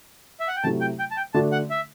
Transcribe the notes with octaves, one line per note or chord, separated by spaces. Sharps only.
E5
F#5
G5
C3 F#3 A3 E4 A5
G5
G5
A5
G5
D3 A3 D4 F#4 A5
F#5
E5